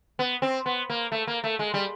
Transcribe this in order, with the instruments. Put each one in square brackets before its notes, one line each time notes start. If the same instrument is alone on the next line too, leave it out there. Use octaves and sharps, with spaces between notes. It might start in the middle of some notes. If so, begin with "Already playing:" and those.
[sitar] B3
C4
B3
A#3
A3
A#3
A3
G#3
G3